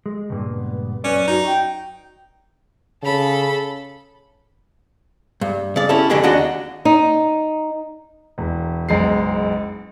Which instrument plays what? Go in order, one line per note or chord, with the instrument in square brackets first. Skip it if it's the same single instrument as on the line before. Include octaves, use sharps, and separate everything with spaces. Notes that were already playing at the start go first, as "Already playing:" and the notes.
[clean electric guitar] G#3
C#2 G2 A#2
[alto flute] B3
[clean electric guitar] F#2 B4 D5 [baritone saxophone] C#4
[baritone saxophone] D#4 [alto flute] F#4
[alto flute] G5
[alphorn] C#3 [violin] A4 B5
[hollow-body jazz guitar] G2
C#3 D5
C#4 E4 G4 A4
F2 B2 D3 G#3 G4 G#4
D#2 D4 F#4 G#4 D#5
[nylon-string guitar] D#4
[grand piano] E1
F#1 B1 G#3 C7